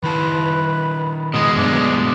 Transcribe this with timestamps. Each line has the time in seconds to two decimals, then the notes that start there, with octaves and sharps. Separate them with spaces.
0.04 D#3 E4 B4 A5
1.34 B2 G#3 D#5
1.57 G2 F#3 B3 D4